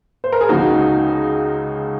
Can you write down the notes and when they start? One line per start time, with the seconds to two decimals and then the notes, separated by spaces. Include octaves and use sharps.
0.24 C5
0.32 A#4
0.41 G#4
0.49 C#2 C#3 F3 D#4 F#4